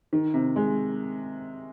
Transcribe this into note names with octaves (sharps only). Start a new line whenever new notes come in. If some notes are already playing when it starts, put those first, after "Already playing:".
D#3
C3
G#3